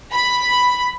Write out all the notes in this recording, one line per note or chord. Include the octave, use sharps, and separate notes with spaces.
B5